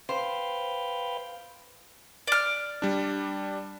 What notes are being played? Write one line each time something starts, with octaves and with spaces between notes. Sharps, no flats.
B4 C5 F5 G5
D5 F6
G3 D4